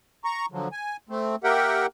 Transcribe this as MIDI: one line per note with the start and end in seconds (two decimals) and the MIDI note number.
0.24 0.46 82
0.24 0.46 85
0.52 0.68 50
0.52 0.68 53
0.52 0.68 54
0.72 0.97 80
1.09 1.36 57
1.09 1.36 60
1.44 1.86 58
1.44 1.86 67
1.44 1.86 70
1.44 1.86 76
1.44 1.86 78
1.44 1.86 79